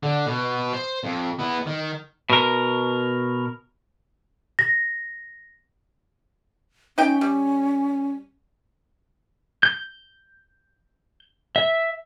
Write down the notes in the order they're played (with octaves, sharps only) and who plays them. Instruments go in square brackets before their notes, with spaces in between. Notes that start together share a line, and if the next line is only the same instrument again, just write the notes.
[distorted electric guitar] D3
B2
C5
F2
B3 E4
D#3
[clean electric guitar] B2 A#4
[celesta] A#6
[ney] C#4 [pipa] D#4 G5
[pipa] G3
[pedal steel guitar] G6
E5